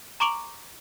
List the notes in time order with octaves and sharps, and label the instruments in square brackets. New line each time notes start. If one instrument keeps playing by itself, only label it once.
[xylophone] A#5 C#6 D6 D7 F7 F#7